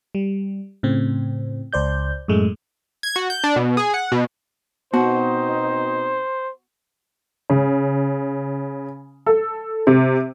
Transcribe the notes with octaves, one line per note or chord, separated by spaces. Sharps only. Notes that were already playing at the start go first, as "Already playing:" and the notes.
G3
A2 C#3 C4
C#2 C5 D5 G6
F#2 A2 G#3 A3
G#6
F#4
G6
D4
B2
G#4
F#5
B2
B2 B3 C4 D#4 F#4 C5
C#3
A4
C3